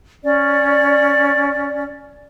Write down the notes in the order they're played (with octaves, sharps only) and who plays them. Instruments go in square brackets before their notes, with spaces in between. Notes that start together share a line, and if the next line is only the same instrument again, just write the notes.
[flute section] C#4 D5